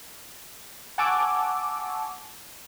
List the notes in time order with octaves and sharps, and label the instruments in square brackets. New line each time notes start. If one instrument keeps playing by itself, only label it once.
[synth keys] F#5 G#5 A5 C#6 D6 E6